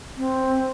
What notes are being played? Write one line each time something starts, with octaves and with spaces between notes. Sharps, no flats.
C4